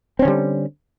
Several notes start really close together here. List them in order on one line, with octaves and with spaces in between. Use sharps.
C4 C#4 D3 G3